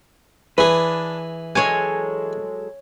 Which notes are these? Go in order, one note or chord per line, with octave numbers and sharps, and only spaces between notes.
E3 D4 G#4 B4
F#3 G#3 A4 C#5 G#5